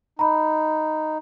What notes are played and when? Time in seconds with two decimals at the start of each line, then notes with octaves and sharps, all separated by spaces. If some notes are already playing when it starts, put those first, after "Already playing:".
0.19 D#4 A#5 B5